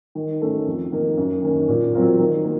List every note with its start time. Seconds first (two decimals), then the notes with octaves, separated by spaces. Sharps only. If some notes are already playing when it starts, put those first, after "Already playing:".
0.15 D#3
0.42 A3 C#4
0.67 F2
0.92 D#3 A#3
1.17 F#2
1.43 D#3 A#3 C#4
1.68 A#2
1.94 F#3 C4 F4 A#4
2.19 D#3
2.44 A#3